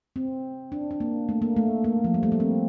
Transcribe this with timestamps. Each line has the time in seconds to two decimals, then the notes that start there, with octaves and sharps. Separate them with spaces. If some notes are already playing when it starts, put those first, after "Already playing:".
0.16 C4
0.72 D4
0.91 D4
1.00 A#3
1.29 A3
1.42 A#3
1.56 A3
1.84 A#3
2.04 F3
2.14 G3
2.23 A3
2.32 A#3
2.40 C4